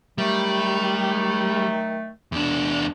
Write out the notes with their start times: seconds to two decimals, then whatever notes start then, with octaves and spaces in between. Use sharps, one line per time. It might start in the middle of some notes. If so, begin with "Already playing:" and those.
0.18 D#3 F#3 G3 A3
2.32 E2 D4